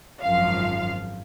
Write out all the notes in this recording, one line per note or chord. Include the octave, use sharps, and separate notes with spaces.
G#1 F#2 F3 F5